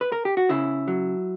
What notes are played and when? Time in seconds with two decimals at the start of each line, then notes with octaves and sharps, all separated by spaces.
0.01 B4
0.12 A#4
0.25 G4
0.37 F#4
0.49 C#3 E4
0.88 F#3